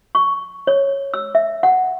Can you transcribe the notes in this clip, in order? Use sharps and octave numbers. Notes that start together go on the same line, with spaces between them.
C#6
C#5
E6
E5
F#5